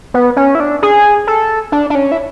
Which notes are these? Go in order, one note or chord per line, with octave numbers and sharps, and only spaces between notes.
B3
C#4
E4
D4
G#4
A4
D4
D4
C#4
E4